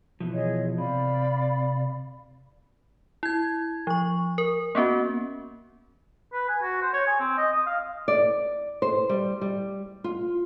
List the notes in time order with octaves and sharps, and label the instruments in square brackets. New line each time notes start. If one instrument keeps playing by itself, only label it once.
[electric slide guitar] B2 E3 F3
[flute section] G#4 C#5 D#5
[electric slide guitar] C3 [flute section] D5 F5 B5
[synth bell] E4 G#6
F3 C#6
A#4
A#3 B3 C#4 F#4
[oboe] B4
G#5
F#4
C5
C#5
G#5
C4
D#5
D#6
F5
[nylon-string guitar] D5
C5
G3
G3
F4